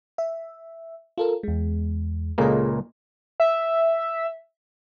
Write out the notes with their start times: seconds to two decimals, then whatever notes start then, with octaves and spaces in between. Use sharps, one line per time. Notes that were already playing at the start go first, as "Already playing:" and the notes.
0.18 E5
1.18 F4 A4 A#4
1.43 E2 G#3
2.38 C#2 A#2 A#3 G#4 A4 D#5
3.40 E5